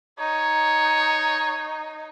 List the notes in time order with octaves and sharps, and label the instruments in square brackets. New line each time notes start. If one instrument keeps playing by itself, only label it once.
[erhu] D#4 [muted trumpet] C#5